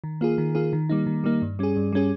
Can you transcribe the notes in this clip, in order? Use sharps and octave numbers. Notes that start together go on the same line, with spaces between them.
D#3
A#3 F4 G#4
D#3
A#3 F4 G#4
D#3
G3 A#3 D#4
D#3
G3 A#3 D#4
G2
G3 C#4 G#4
G2
G3 C#4 G#4